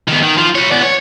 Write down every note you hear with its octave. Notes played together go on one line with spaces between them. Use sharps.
D#3 B3
D#3
F3
B4 C#5
B3 D5
C#5